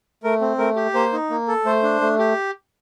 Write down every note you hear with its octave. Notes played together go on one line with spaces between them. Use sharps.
A3 A#4
C4
A3 A#4
G4
A#3 C5
D#4
A#3
A4
A3 C5
D4
A3
G4